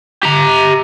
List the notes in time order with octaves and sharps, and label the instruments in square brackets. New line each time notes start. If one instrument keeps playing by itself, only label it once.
[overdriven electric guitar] G4 A#5